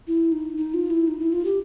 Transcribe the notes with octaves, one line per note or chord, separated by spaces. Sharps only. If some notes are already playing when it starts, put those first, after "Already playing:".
E4
D#4
D#4
F4
E4
D#4
E4
F4
G4